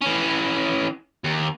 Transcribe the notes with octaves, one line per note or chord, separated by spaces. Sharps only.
E3 C#4
D#2